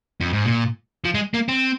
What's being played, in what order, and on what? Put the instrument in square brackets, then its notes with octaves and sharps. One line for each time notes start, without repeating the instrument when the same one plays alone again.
[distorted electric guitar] F2
G#2
A#2
F3
G#3
A#3
C4